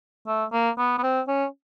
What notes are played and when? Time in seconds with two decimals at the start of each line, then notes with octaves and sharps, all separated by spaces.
0.27 A3
0.52 A#3
0.78 B3
0.98 B3
1.03 C4
1.28 C#4